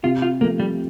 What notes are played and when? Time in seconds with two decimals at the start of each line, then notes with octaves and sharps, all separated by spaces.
0.03 C3 F4
0.22 F4
0.41 F3 A3 A#3
0.60 G3